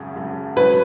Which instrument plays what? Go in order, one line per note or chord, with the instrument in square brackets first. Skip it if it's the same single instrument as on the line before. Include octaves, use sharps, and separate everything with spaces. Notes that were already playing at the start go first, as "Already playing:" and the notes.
Already playing: [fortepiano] G#1 F#2 C#3
G#1 F#2 C#3
[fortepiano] G#2 F#3 C#4 [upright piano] B4